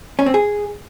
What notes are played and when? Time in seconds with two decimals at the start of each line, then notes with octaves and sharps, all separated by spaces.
0.19 C#4
0.26 C4
0.34 G#4